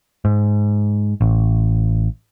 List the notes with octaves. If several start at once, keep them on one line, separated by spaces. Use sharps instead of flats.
G#2
A1